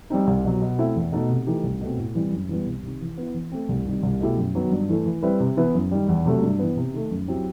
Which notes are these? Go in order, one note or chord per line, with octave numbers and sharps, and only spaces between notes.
G3 C4 D#4
C2
B2 F#3
B2
A3 C4 E4
E2
B2 A3 D#4 A4
C3
E3 A3 D#4 G4
C2
B2 A3 C4
A2
E3 G3 C4
F#2
E3 G3 B3
C2
C3 D#3
E3
B3 E4
E3
A3 C4
C2
C3 D#3 G3
C2
B2 A3 E4 G4
F#2
D#3 F#3 B3
G2
E3 A3
E3
G3 C4 E4 B4
C3
E3 B3 E4
F#2
D#3 G3
E2
C3 F#3 A3
G2
E3 B3
C3
D#3 A3
F#2
F#3 C4 E4 G4